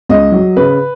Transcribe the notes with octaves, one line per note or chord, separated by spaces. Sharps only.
C#2 D#5
F#3
C#3 B4